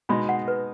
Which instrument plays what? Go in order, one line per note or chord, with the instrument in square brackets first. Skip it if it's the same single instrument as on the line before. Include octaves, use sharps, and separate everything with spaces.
[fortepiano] B2 G#3 D#4 [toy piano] B5
[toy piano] F#5
B4